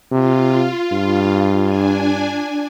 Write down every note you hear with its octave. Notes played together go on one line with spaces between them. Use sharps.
C3 F4
G2
D4 G#5